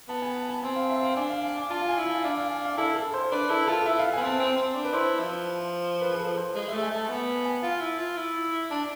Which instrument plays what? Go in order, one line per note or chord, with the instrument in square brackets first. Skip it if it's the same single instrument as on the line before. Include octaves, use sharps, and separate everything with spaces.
[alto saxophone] B3 [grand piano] A5
[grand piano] G#5
A5
A5
[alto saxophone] C4 [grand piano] G#5
[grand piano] F5
E5
F5
[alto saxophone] D4 [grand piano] G#5
[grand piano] F5
F5
G#5
[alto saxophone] F4 [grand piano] A5
[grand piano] F5
G#5
[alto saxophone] E4
[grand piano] F5
[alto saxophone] D4 [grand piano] F5
[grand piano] F5
G#5
F5
[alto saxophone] E4 [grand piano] A4
[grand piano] A4
C5
[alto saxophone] D4 [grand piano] B4
[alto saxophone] E4 [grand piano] A4
[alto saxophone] F4 [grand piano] A4
[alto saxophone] E4 [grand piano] E5
[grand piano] F5
[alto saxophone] B3 [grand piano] G#5
[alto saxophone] C4 [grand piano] A5
[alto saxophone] C4
C4
D4
[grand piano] B4
[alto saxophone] E4 [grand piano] C5
[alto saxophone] F3
[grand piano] B4
G#4
A4
C5
[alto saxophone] G#3
[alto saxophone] A3 [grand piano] E5
[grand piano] G#5
[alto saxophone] A3 [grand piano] A5
[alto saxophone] B3 [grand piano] G#5
[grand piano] G#5
[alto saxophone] F4 [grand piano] F5
[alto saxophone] E4
F4
E4
[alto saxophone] D4 [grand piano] A5